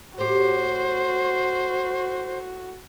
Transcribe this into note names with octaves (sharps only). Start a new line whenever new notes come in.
A2 F#4 G4 C5